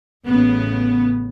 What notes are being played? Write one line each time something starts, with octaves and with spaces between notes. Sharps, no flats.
A1 C#3 B3